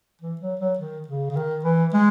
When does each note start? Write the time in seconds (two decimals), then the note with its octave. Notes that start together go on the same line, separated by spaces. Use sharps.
0.21 E3
0.41 F#3
0.59 F#3
0.78 D#3
1.08 C#3
1.30 C#3
1.36 D#3
1.65 E3
1.94 G#3